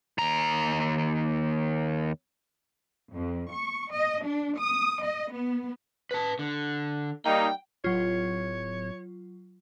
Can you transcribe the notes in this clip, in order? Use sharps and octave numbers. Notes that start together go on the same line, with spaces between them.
D#2 A#5
F2
C#6
D#5
D4
D#6
D#5
B3
B4 A5
D3
G3 A#3 D#4 G5
D1 F#3 F4 C#5